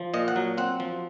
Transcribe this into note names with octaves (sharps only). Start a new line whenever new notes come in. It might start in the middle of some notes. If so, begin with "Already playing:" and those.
Already playing: F3
A#2 D#5
F#5
F#3
C4 F#5
F3